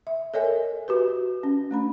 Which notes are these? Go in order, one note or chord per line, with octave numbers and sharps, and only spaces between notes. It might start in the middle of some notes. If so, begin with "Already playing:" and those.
E5
A4 A#4 C#5 D#5 E5 G#5
F#4 G4 B4
C#4
A3 D4 B5